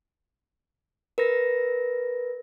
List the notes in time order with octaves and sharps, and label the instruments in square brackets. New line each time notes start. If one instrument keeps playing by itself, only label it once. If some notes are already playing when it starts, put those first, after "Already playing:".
[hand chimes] A#4 B4 A#6